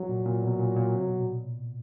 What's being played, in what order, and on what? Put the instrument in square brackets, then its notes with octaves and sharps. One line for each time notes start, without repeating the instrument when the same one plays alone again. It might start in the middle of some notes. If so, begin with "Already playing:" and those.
Already playing: [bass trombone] F#3
[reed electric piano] A#2
A#2
B2
A#2
A#2
C3
B2
A#2